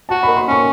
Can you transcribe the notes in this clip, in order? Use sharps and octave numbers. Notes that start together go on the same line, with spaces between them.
F#4 A5
D#3 B5
C6
C#4 C#6